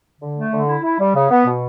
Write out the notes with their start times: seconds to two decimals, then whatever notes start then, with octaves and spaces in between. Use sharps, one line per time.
0.20 D3
0.37 A3
0.52 D3
0.68 E4
0.83 E4
0.99 G3
1.15 C#3
1.30 B3
1.46 B2